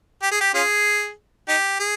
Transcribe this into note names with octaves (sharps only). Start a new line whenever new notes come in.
G4
G#4
G4
C#4 F4 G#4
D#4 G4
G#4